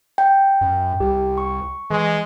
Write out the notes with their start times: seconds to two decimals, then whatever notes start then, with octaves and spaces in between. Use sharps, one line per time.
0.18 G5
0.61 F#2
1.00 C2 G4
1.38 C#6
1.90 E3 G#3